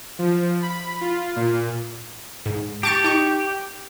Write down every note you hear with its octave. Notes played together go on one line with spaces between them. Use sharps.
F3
B5
F4
A#2
G#2
G4 A5 C#6 A6
D#4 C#6